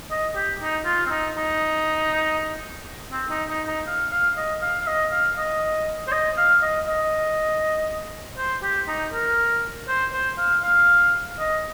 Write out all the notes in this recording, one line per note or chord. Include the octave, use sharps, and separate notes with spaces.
D#5
G4
D#4
F4
C4
D#4
D#4
C4
D#4
D#4
D#4
F5
F5
D#5
F5
F5
D#5
F5
D#5
C5
D#5
F5
D#5
D#5
C5
G4
D#4
A#4
C5
C5
F5
F5
D#5